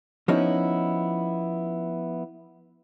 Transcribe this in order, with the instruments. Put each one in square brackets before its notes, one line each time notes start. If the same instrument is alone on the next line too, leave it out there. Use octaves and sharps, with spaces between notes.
[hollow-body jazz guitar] F3 B3 C#4 D#4 E4